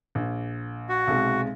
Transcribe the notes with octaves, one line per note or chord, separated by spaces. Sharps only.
A#1
F#4
B1 C3 G#3